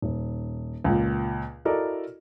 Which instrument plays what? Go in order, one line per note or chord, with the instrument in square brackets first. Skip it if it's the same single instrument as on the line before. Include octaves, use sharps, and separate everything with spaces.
[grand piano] D#1
C#2 A#2
E4 F#4 A4 A#4 D5 D#5